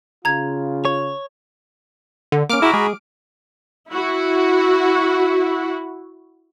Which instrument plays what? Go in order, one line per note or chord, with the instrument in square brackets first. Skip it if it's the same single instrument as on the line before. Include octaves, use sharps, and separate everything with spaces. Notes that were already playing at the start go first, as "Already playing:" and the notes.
[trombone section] C#3 F4 [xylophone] A#5 G#6
[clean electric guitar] C#5
[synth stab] D3
[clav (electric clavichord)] A#3 C#4 [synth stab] D6 F6 D7
[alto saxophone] E4 [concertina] F#4 A#5 B5 [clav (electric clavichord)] G#4 E5 F#5
[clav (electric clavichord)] G#3 [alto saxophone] G#4
[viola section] E4 F#4